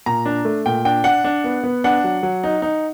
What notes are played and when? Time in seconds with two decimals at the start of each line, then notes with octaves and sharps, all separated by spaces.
0.06 A#2 A#5
0.26 D4
0.45 A3
0.66 A#2 G5
0.85 D4 G5
1.04 D4 F#5
1.24 D4
1.44 B3
1.64 B3
1.84 D4 F#5
2.04 F#3
2.23 F#3
2.44 D#4
2.62 D#4